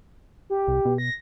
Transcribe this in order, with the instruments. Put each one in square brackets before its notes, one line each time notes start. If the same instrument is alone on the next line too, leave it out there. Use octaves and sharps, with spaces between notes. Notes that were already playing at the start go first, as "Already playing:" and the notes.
[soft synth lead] G4
[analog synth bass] C2
B2
[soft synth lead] A#6